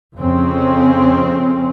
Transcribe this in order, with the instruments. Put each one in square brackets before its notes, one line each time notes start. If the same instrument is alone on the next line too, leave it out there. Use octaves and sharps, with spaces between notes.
[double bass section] F2 C#3 C4 C#4